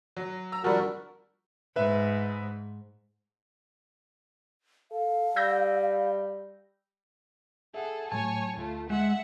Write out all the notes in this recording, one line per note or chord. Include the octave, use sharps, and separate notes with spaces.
F#3
A#5 E6
F3 G3 D4 F#4 A#4 F#5
G#2 B4 E5
A4 F5
G3 E6 G6 A#6
G#4 A4 E5 F#5
A2 F#3 A3 C#5 G#5 A5
D2 A3 F4
G#3 E5 F#5